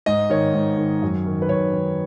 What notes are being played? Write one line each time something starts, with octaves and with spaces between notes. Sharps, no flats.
G#2 D#5
D#3 C#5
G#2
D#3
F#2
D#3
B4
F#2 C#5
D#3